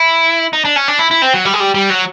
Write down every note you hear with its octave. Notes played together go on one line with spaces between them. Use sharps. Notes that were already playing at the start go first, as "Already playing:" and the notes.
Already playing: E4
D#4
D4
C#4
D4
E4
E4
C4
F#3
G3
G#3
G3
G3
F#3